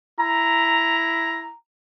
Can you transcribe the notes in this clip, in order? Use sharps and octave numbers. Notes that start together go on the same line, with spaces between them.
E4 A#5